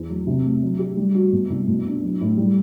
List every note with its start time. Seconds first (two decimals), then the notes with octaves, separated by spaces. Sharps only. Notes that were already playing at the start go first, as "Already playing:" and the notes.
Already playing: E2
0.10 F#3
0.27 C3
0.44 A3
0.63 F#3
0.79 G4
0.97 G3
1.15 F#4
1.33 B2
1.50 C2
1.68 B2
1.85 D4
2.02 F#3
2.21 A2
2.37 G3